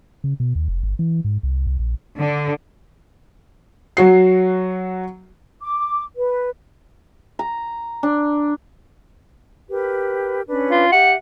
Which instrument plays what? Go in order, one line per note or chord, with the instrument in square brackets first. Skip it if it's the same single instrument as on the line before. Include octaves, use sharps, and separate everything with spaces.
[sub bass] C#3
B2
D#2
F1
G1
E3
G#2
C2
C2
A#1
[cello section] D3
[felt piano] F#3 F#4 C7
[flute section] D6
B4
[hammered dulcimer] A#5
D4
[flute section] G4 A#4 B4
C#4 D4 B4
[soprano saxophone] F4
[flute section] G4 E5 [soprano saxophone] F#5